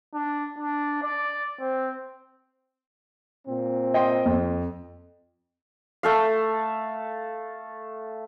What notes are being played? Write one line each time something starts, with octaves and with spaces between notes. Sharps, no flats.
D4
D4
D5
C4
A#2 C4
D#5 G5 C6
F2
A3 A4 F5